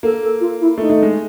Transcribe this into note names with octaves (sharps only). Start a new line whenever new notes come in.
A#3 A4
A4
F4
E4
A3 D#4
A3
G#3